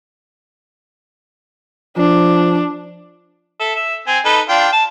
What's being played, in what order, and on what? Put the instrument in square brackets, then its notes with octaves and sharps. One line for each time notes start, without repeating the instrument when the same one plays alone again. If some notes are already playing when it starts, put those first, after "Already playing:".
[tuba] F3 [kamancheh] D4
[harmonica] A4 E5
E5
C4 G#5
D#4 A4 B4
D4 F4 G5
A5